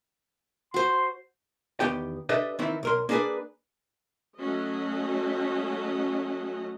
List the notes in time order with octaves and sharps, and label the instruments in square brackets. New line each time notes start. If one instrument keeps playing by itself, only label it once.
[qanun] F#4 C5 [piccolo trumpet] C6
[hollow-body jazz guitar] E2 D#3 B3 G4 G5
D4 G4 A4 B4 D#5 E5
D#3 E3 C4 E4
B1 A#4 C6
A#3 D4 G#4 A#4 B4 D5
[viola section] F#3 A3 C#4 F#4 D#5